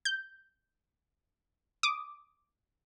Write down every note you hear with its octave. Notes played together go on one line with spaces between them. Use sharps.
G6
D6 D#6